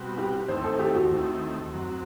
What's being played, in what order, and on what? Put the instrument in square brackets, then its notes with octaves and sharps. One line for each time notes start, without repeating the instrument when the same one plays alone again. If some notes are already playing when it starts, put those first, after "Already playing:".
Already playing: [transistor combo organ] B2 G3 C4 F#4
[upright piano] G4
[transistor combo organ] D#2 D#3 A3 C4 E4 [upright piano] C5
[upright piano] A4
G4
F#4
[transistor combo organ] D#2 D#3 A3 C4 E4
F#2 F#3 C4